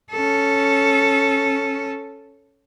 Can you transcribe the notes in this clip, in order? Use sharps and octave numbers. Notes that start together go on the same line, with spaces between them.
C#4 A4